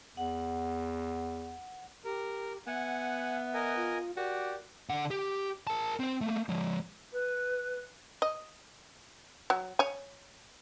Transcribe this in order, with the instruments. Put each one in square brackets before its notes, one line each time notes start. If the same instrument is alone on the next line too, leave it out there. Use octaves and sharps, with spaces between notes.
[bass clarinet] E2 [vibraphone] F#5
[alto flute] G4 [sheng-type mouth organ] A#4
[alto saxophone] B3 [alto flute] E5 [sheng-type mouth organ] F#5 G#5
[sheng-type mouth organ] A#4 D#5 G#5
[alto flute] F4
[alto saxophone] F#4 [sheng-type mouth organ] G4 D5 [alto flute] A#4
[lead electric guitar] D3 F#5
G4
A#4 A5
C4 C5
A3 A#3
F3 G#3
[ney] B4
[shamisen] D#5
F#3
C#5 G#5